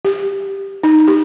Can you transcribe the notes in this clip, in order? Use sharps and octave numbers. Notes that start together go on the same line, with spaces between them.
G4
D#4
G4